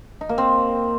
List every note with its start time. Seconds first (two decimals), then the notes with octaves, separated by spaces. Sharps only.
0.21 D#4
0.29 A#3
0.38 C4